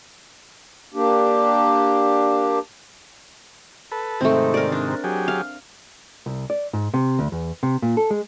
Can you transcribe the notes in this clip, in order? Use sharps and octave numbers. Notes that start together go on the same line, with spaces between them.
A#3 D4 G4
A4 B4
G#2 C3 D#3 A3 C4
A#4 D5
D4
F#3 G4 G#4
F5
C2
D5
G#2
C3
D2
E2
C3
A#2
A4
G#3